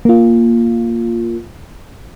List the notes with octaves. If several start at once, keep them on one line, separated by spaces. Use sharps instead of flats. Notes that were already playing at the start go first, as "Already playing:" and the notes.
A#3 F4